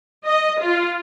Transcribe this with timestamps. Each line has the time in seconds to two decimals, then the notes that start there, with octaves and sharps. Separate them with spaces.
0.25 D#5
0.59 F4